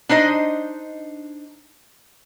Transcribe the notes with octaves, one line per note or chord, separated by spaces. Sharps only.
D4 D#4 C5 D#5